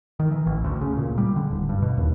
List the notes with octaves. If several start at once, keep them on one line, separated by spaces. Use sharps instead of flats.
D#3
E3
A1
D2
C#3
A#2
G3
D3
D1
G2
B2
D#2